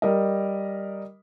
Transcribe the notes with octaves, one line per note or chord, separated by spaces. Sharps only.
G3 A#4 D#5